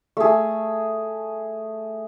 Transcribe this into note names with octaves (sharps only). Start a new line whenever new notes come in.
A3 G#4